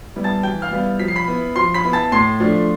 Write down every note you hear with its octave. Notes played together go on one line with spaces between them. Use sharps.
G3 B3 E4
A5 A6
E3 G5 G6
F5 F6
G3 B3 E4
F3 B6
C7
B5 B6
B3 E4
F3 C6 C7
B5 B6
B3 E4
A5 A6
A2 C6 C7
F3 A3 D4